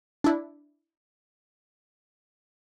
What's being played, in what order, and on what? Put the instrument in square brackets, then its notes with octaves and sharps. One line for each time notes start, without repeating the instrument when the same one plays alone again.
[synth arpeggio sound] D4 E4